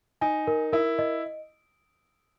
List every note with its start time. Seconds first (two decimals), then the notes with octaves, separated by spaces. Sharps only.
0.21 D#4 G#5
0.47 A#4
0.73 E4 A#4
0.99 D#5